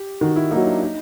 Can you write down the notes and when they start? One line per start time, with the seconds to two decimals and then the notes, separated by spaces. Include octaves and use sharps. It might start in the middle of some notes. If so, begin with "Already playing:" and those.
Already playing: G4
0.21 D#3 F#4
0.36 E4
0.51 F#3 A#3 D#4
0.67 D4
0.82 D#4